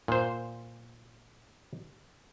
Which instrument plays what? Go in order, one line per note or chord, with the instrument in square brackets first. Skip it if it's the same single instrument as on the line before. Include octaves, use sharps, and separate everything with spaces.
[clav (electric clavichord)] A#2 C5